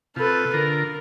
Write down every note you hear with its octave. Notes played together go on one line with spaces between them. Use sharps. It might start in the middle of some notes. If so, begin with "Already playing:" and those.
C3 F4 A4 B4
D3 F4 A#4 A#5